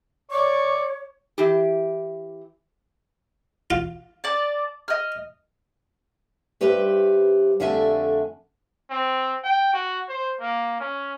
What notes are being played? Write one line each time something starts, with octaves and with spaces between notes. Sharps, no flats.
C#5 D5 C#6 D6
E3 G4
F4
D5 A5
D#5 F6
G2 G4 B4 C5 E5
F2 D3 A3 E5 G#5
C4
G5
F#4
C5
A#3
C#4